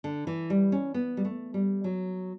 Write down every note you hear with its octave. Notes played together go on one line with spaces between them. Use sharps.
D3
E3
G3
C#4
B3
G3
A3
G3
F#3